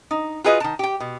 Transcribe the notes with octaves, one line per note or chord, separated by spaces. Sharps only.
D#4
F4 F#4 G#4 B4 D#5
D#3 A5
G4 G5
B2